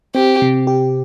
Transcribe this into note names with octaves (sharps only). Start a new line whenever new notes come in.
C4 G4
C3
G4